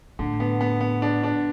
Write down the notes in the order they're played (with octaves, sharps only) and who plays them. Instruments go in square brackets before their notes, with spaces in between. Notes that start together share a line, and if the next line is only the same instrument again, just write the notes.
[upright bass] A2 [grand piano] D3
[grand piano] B3
B3
B3
D4
D4